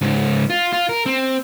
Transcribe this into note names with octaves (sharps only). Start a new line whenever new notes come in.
C#2 G#2
F4
F4
A#4
C4